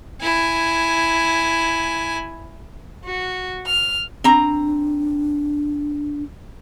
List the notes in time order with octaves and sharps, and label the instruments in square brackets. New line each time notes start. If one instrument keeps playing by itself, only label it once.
[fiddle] E4 G#5
[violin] F#4
F6
[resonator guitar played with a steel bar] C4 A#5 [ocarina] D4